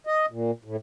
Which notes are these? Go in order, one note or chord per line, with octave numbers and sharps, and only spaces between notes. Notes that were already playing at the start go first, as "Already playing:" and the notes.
D#5
A#2
A2